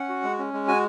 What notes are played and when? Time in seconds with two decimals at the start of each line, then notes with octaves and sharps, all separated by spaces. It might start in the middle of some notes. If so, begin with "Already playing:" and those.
Already playing: C#4 F#5
0.09 F#4
0.23 G#3
0.39 C#4
0.53 G#3
0.68 F#4 G#5